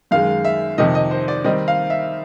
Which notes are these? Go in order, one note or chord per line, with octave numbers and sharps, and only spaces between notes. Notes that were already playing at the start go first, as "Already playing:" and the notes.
F#2 D#3 G#3 F5
E5
F2 C3 D#3 D#5
D#5
C5
D5
D#3 G3 C4 D#5
F5
E5